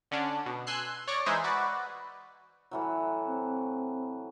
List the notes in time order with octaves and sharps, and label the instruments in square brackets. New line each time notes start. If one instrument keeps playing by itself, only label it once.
[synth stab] D3 C#4 D4
B2
G#5 C6 E6 F#6 C7
C#5 D5 C#6 D6 A#6
E3 G#3 D#4 G#4 C5 E5
F#4 B4 D5
[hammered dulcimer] A2 E3 F#3
[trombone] C4